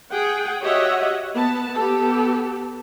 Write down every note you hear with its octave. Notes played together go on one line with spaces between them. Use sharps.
G#4 F#5 G5
F#4 G4 C#5 D#5 E5 F#5
B3 A5
B3 G4 A4